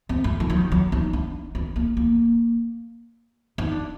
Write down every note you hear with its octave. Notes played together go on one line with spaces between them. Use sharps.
C4
A3
D#3
F#3
D#3
F#3
D#4
D4
D4
A#3
A#3
D#4
D4